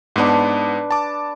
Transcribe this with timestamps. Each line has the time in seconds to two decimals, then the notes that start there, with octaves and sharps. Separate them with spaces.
0.16 G#2 B3 D4 B4
0.91 A5 D6